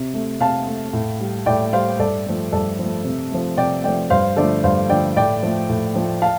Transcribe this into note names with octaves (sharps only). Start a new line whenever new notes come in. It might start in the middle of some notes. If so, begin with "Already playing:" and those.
Already playing: C3
A3
C3 F5 A5
A3
A2
G3
A2 D5 G5
G3 C5 F5
G2 A4 D5
F3 A3
G2 A4 D5
F3 A3
C3
F3 A3
C3 D5 G5
F3 A3 D5 G5
G2 C5 F5
D3 F3 A3 A4 D5
G2 C5 F5
D3 F3 A3 D5 G5
A2 D5 G5
F3 A3
A2
F3 A3
F5 A5